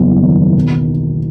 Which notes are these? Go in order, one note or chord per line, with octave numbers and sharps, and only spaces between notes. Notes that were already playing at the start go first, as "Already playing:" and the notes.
Already playing: F#1 E2 G3
D#3
B1